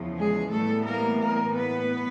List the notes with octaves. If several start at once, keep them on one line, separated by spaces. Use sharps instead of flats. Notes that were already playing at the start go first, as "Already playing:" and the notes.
Already playing: E2 C#3 F3
G#3 G#4
A2 E3 G3 A3 B3 A4
A#3 A#4
A#3 A#4
B3 B4